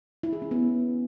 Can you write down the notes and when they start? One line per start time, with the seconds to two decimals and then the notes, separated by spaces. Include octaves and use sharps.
0.23 E4
0.33 G#4
0.42 C#4
0.51 B3